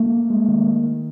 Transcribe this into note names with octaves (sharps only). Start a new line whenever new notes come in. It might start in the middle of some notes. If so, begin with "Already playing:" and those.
Already playing: A3 A#3
G#3
D#3
D#3
D#3